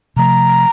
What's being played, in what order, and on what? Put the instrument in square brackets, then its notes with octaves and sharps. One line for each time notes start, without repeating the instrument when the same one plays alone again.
[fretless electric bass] C3 F3 A3 [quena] A#5